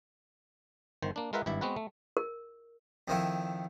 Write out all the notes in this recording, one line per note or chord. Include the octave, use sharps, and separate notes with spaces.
G1 D#3 C5
A#3 D4
G#3 F4 A#4 B4 E5 F#5
G#1 G2 E4 E5
G#3 B3 C4 F#4 B4
A3
A#4
F2 D#3 E4